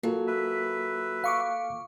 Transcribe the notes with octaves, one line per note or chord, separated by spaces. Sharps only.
F#3 A#3 F4 A4
B4 E5
F5 C#6 D6